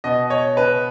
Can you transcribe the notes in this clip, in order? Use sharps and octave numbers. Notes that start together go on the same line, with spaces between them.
B2 D#5
C#5
B4